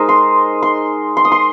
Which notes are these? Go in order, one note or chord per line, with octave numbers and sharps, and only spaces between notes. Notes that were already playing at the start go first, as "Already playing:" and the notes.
Already playing: G#3 D#4 A#4 C5 D#5
C6
C6
C6
D#6
C6